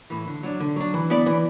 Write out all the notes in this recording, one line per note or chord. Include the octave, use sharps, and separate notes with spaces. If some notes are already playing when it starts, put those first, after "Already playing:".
A2 E3
D3
F#3 D4
D3
F#3 D4
E3
B3 E4 D5
E3